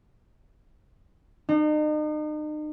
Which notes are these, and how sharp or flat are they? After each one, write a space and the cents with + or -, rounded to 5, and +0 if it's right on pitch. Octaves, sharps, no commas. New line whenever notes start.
D#4 -40